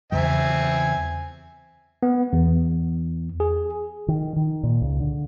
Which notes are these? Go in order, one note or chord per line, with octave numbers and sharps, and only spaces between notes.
E2 C#3 F#3 C4 E5 G#5
B3
E2
G#4
D#3
D#3
A#2
C#2
D3